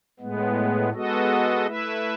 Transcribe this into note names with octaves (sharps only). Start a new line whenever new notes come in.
A2 G#3 B3
G#3 B3 F#4 A4 D#5
A3 E4 B4 E5